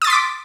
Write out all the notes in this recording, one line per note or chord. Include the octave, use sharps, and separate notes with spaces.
C6 D6 D#6 A6 B6